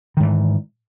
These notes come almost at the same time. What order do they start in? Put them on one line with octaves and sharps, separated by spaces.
D#3 G#2 E3